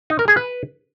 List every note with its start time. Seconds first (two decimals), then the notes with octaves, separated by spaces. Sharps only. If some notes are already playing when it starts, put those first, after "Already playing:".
0.10 D#4
0.19 A#4
0.28 G#4
0.37 B4